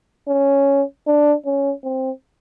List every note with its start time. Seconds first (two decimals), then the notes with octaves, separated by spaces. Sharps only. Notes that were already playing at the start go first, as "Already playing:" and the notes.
0.28 C#4
1.07 D4
1.46 C#4
1.83 C4